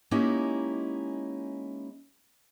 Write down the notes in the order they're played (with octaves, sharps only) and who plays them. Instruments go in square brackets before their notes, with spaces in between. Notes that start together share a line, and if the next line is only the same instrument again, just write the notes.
[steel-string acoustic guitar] G#3 A#3 C#4 D#4 E4 G4